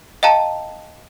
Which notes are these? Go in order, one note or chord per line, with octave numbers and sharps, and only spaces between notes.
D#5 F5 G5 A5 A#5